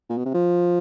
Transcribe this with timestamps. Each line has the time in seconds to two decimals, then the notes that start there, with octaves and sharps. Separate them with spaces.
0.09 A#2
0.17 B2
0.25 C3
0.34 F3